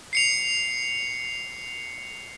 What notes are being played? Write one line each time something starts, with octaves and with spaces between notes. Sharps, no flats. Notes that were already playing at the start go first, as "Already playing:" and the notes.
C7 C#7 F7